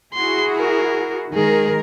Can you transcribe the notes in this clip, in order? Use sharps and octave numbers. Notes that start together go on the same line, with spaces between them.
E4 F#4 G#4 C6
A#4
D#3 G#3 G#4 A#4